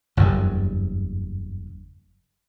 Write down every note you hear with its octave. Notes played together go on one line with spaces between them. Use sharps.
F#1 E2 G2